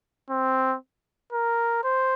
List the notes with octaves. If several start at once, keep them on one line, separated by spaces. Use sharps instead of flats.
C4
A#4
C5